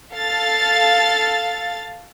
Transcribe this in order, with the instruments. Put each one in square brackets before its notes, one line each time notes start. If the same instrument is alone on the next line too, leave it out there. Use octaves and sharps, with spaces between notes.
[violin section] A4 F5 A6